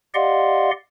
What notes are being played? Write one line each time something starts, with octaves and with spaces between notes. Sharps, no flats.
G4 D5 D#5 F5 F#5 C6